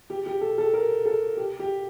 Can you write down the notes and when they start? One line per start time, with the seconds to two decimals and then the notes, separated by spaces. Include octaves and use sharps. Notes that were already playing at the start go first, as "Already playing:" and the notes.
0.10 G4
0.26 G4
0.41 A4
0.58 A4
0.73 A#4
1.05 A4
1.37 G4
1.59 G4